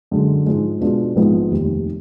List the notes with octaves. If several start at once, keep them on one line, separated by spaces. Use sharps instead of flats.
F#2 D3 G#3
G#2 F3 G#3
B2 G#3 D4 F4
A#1 G#2 F3 G#3 B3
F1 D#2 D#3